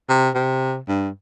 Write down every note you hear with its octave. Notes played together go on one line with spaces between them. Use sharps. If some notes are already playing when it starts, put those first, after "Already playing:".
C3
C3
G2